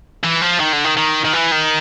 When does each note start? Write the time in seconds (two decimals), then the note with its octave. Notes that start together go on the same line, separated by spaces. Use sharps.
0.24 E3
0.42 F3
0.60 D#3
0.73 D3
0.84 D#3
0.97 D#3
1.25 D#3
1.33 E3
1.52 D#3